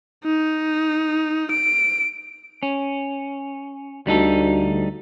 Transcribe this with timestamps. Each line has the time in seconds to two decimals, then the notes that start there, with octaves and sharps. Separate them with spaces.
0.24 D#4
1.51 D7
2.63 C#4
4.07 D2 G3 D#4 A4